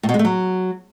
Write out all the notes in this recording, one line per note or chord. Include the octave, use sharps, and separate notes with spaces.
A2
B2
G#3
A3
F#3